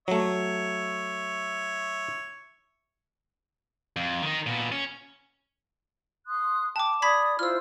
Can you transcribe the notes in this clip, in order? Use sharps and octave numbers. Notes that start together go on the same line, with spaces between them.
F#3 A3 C#5 E5
F2
D#3 D#4
A#2 B3
C#4
C6 D#6 F#6
G5 A5 D6
D5 B5 D#6 G#6 B6
E4 F4 C5 E6 F6